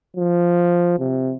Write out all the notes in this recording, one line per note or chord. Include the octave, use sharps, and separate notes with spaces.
F3
C3